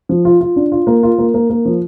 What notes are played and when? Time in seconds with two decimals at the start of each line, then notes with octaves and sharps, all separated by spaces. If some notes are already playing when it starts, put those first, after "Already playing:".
0.09 F3
0.25 F4
0.41 F4
0.56 D4
0.72 F4
0.87 A#3
1.03 F4
1.18 A#3
1.34 A#3
1.50 A#3
1.65 F3